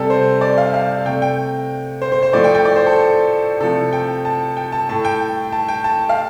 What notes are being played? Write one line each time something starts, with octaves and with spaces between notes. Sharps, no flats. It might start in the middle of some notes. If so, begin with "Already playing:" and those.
Already playing: C3 G3 A4
C5
D5
F5
F5
C3 A3 G5
G5
C5
C5
C5
A2 F3 A3 D5
G5
G5
D5
C5
A4
C3 F3 A3 A4
G5
A5
G5
A5
A2 A3 A5
G5
A5
G5
A5
F5